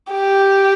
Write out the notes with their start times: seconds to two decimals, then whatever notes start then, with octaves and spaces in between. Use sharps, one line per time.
0.11 G4